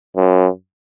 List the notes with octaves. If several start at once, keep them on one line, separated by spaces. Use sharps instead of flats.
F#2